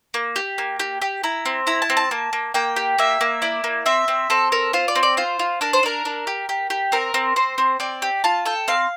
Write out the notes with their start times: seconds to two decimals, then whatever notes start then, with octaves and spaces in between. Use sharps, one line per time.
0.14 A#3
0.36 G4
0.58 A#3
0.79 G4
1.02 G4
1.23 E4 A#5
1.45 C4
1.67 E4 A#5
1.82 A5
1.90 C4
1.97 A5
2.11 A#3
2.33 A#3
2.54 A#3 G5
2.76 G4
2.99 A#3 E5
3.21 A#3
3.42 E4 D5
3.64 A#3
3.86 C4 E5
4.08 C4
4.30 C4 A4
4.52 A4 A#4
4.73 F4 C5
4.88 D5
4.95 C4
5.03 D5
5.17 F4 C5
5.39 F4
5.61 D4 A#4
5.73 C5
5.83 D4 A#4
6.05 D4
6.27 G4
6.49 G4
6.70 G4
6.92 C4 A#4
7.14 C4
7.36 C4 C5
7.58 C4
7.80 C4 D5
8.02 G4
8.24 F4 A5
8.46 A4 G5
8.68 C4 F5